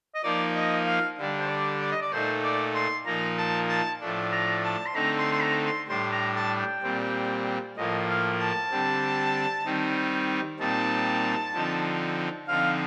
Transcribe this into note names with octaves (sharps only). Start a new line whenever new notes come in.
D#5
F3 A#3 D#4 D5
D#5
F5
D3 G3 D4
C5
D5
D5
D#5
D5
A#2 A3 D#4 C5
D5
C6
A#2 F3 A#3 D#4 A#5
A5
A5
A2 F3 A3 D4
A#5
A5
C6
D3 A3 C4 D#4 A#5
C6
C6
A#5
C6
A2 G3 D4 C6
A#5
A5
G5
A#2 G3 C4
A2 F3 A#3 D#5
F5
A5
D3 G3 C4
D#3 G3 C4 D#4
A#2 G3 C4 D#4 A5
D3 F3 C4 D#4
D3 F3 C4 D#4 F5